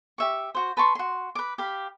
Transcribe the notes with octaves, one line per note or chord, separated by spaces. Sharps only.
G4 E5 C#6
F#4 C5
B4 A5 C6 C#6
F#4 C6
B4 D6
G4 F5 B5